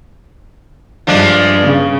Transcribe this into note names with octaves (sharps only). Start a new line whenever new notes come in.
G2 F3 G#3 D4
C#3